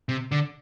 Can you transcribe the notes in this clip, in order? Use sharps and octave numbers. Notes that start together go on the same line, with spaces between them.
C3
D3